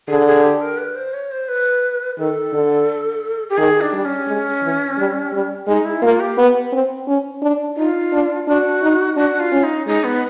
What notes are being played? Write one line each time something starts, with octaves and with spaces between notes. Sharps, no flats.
D3 G#4
G#4
G4
A#4
B4
C5
C#5
C5
B4
D#3 A4
D3
G4
D#3 G#4
D4
G3
C#4
G#3
E3
G3
G3
G#3 D#4
E4
A#3 F4
G4
B3
C4
C#4
D4
D#4 F4
D4
D4 F#4
D#4
D4 F#4
F4
C#4
D#4
G#3 D#4
B3